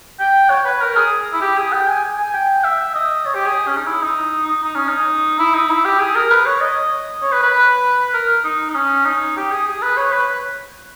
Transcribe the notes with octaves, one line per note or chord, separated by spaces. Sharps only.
G5
C#5
B4
A#4
G#4
E4
G4
G#4
G5
G#5
G#5
G5
E5
D#5
C#5
G4
G#4
C#4
D#4
E4
D#4
D#4
D#4
C#4
D#4
E4
D#4
E4
G4
G#4
A#4
B4
C#5
D#5
C#5
B4
B4
A#4
D#4
D#4
C#4
D#4
G4
G#4
G#4
B4
C#5
B4